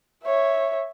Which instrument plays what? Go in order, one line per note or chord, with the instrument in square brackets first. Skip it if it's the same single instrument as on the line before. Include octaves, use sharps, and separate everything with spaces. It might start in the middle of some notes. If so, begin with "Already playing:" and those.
[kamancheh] C#5 E5